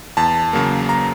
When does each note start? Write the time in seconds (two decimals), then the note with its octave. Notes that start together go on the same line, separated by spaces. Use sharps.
0.17 E2 A5
0.53 C#3 F#3 A#3
0.89 A#5